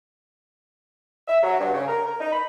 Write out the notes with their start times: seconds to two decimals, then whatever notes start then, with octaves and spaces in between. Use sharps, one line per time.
1.28 E5
1.43 F#3
1.60 G2
1.74 C#3
1.88 A#4
2.06 A#4
2.20 D#4
2.32 B5